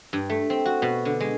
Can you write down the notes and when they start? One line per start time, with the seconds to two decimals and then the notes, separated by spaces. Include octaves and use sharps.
0.13 G2
0.30 A3
0.50 C4
0.65 F#4
0.82 B2
1.05 D3
1.20 G#3